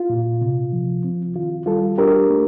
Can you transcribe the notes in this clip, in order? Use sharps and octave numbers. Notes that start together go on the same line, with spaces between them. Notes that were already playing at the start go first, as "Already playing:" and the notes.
Already playing: F4
A#2
C3
F3
C4
D#3 F4
G3 F4 A4
D4 G4 A#4
A3